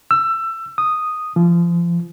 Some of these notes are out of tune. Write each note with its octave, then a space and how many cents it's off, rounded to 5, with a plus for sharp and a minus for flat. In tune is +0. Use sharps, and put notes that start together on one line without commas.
E6 +20
D#6 -5
F3 -30